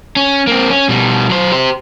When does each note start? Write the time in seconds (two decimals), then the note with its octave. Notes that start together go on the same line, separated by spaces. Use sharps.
0.16 C#4
0.47 A#3 C4
0.70 C#4
0.89 B2 G3
1.30 F#3 C5
1.52 G4 C5